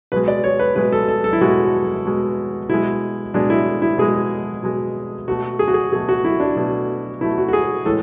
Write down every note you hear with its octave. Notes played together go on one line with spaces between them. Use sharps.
B2 G#3 B4
D5
C#5
B4
B2 G#3 B4
A4
A4
A4
E4
B2 G#3 F#4
B2 G#3
B2 G#3 E4
B2 G#3 D4
E4
E4
B2 G#3 G#4
B2 G#3
B2 A3 F#4
G#4
F#4
G#4
B2 A3 G#4
F#4
E4
D4
B2 A3
B2 A3 E4
F#4
F#4
G#4
A2 E3 G#3 A4